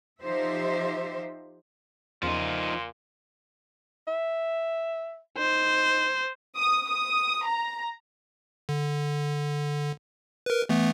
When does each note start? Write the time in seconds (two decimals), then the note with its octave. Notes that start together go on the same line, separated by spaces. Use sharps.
0.21 F3 D#4 G4 C5 E5
2.23 E2 A#2 C#3 F3 D#4 C6
4.07 E5
5.39 D#4 C5
6.56 D#6
6.89 D#6
7.45 A#5
8.69 D3
10.46 A#4 B4
10.69 E3 A3 B3